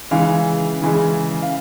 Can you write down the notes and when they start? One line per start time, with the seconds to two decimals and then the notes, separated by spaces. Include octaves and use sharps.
0.11 C#3 E3 G#3 F5
0.82 C#3 E3 G#3
1.42 F5